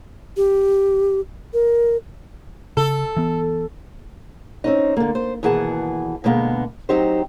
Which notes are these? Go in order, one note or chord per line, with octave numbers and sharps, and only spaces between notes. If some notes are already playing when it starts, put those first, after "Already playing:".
G4
A#4
C#3 A4
E3 B3
C4 C#4 D#4
D3 A#3
C5
D#2 B2 E3 G#4 F#5 A5
B2 D3 G#3 A#3 B3
F#3 C4 D#4 G4 C5